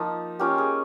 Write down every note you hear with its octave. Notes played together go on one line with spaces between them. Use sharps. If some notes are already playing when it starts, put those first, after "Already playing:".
Already playing: F3 A#3 D#4
A#3 C#4 F4 G4
G#4